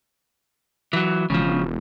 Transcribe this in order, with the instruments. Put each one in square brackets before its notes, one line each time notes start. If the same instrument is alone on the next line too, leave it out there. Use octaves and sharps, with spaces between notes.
[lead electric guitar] E3 F#3
[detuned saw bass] E1 [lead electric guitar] C#3 F3